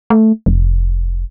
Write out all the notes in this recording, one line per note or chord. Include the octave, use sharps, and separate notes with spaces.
A3
F1